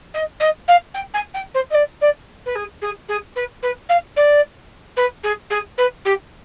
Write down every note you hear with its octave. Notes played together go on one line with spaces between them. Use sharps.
D#5
D#5
F5
G5
G#5
G5
C5
D#5
D5
D5
B4
G#4
G#4
G#4
B4
B4
F5
D5
B4
G#4
G#4
B4
G4